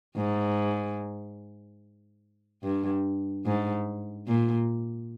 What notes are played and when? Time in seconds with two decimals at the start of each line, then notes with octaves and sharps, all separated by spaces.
0.17 G#2
2.64 G2
3.46 G#2
4.28 A#2